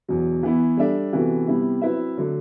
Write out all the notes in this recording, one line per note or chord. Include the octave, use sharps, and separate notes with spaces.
E2 B2 F#3
E3 B3 E4
G3 D4 A4 E5
C3 E3 B3 F#4 A4
C3 G3 B3 E4
F#3 C4 E4 B4 E5
D3 F#3 A3